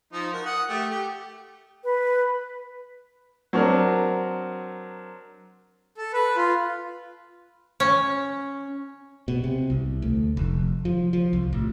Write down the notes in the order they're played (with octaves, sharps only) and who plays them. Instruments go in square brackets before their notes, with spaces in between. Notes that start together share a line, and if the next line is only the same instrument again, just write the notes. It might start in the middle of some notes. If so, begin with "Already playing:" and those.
[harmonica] F3 D#4
F#4 A#4
F#5 D#6
A3 G4
G4
[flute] B4
[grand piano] F#3 C4 D4 A#4
[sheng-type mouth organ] A4
B4
F4
[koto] C#4
[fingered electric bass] B2
C3
C2
D2
F1
F3
F3
C2
A1